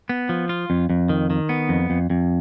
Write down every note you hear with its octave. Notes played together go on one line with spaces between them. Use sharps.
B3
F3
F4
F2
F2
D#3
D#3
B3
F2
F2
F2